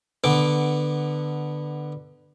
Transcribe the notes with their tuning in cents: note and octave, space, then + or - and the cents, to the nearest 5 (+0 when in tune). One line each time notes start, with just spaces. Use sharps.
D3 +20 B3 +0 D6 +0